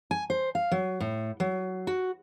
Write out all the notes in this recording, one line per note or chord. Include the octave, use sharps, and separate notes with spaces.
G#5
C5
F5
F#3
A2
F#3
F#4